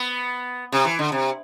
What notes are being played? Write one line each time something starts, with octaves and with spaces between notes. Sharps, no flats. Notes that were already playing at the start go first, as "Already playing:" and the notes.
Already playing: B3
C3
E3
D3
C3